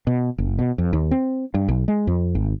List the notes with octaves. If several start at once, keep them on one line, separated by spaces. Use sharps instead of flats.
B2
F#1
B2
F2
D#2
C4
G2
B1
G#3
F2
G#1